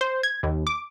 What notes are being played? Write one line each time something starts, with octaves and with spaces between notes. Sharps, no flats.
C5
G#6
D#2
D6